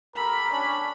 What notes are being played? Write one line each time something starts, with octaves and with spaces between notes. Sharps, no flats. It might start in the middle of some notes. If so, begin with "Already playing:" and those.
G4 A4 A#4 B5
C#4 D4